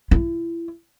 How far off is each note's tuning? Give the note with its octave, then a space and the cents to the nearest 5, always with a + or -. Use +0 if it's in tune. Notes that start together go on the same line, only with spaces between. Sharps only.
E4 +30